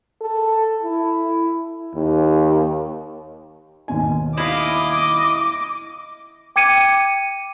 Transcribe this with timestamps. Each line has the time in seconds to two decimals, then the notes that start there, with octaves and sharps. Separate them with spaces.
0.21 A4
0.82 E4
1.95 D#2
3.88 D#2 B2 G#5
4.37 E4 D#5 F5 D6
6.56 G5 D6 G#6 C#7 D#7